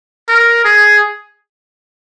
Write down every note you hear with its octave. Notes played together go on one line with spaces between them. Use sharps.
A#4
G#4